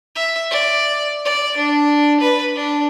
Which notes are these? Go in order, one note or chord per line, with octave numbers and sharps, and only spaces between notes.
E5
D5
D5
D4
B4
D4